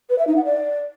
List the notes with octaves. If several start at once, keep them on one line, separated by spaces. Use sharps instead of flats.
B4
E5
D#4
F#5
D5